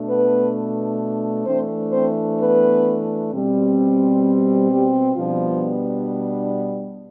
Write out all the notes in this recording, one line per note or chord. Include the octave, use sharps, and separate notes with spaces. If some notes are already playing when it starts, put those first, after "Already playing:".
Already playing: B2 A3 D4
B3 B4
E3 A3 C4 D4 C5
C4 C5
B3 B4
B2 G3 C4
G3 G4
B2 F3 G3 B3 D4 F4